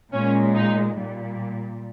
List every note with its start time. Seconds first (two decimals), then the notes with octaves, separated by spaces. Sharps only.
0.13 A#2 G#3 C#4
0.54 D#4
0.96 A#2 G3